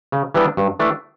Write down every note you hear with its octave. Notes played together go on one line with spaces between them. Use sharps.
C#3
E3 G3 B3 D4
G2
E3 A3 D4